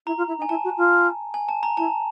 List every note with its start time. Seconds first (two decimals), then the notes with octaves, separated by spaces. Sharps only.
0.06 E4 A#5
0.17 F4
0.27 E4
0.38 D#4
0.42 G#5
0.49 E4 A5
0.64 F#4
0.77 F4
1.34 G#5
1.49 A5
1.63 A#5
1.77 E4 A5